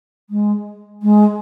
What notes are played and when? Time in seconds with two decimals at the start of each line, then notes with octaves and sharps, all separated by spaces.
0.30 G#3
1.02 G#3